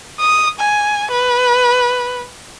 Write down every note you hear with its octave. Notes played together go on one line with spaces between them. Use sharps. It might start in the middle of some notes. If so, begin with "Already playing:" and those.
D#6
G#5
B4